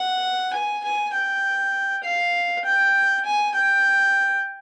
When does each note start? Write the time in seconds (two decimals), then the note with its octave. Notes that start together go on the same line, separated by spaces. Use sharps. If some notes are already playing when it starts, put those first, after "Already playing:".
Already playing: F#5
0.53 G#5
0.84 G#5
1.14 G5
2.03 F5
2.64 G5
3.25 G#5
3.54 G5